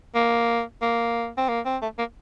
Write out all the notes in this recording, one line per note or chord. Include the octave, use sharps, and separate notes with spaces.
A#3
A#3
C4
A#3
C4
A3
A#3